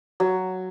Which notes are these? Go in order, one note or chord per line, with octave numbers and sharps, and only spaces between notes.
F#3